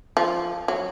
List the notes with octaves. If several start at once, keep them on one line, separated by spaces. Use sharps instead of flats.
F3
F#3